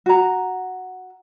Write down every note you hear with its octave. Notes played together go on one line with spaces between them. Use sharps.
F#4 A#5